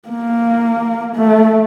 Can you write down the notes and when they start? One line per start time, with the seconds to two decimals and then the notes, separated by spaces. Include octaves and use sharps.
0.09 A#3
1.16 A3